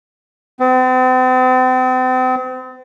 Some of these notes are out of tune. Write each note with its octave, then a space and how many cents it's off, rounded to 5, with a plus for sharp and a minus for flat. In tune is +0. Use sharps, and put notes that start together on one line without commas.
C4 -40